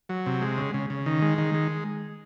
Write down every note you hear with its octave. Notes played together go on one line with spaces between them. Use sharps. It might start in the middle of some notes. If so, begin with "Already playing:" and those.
F#3
C3
G#3
C#3
C#3
C#3
D#3
G#3
D#3
G#3